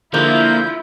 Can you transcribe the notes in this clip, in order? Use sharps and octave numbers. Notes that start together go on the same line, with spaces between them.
D3 F3 G#3 A#3 E4 F4 A#4 G6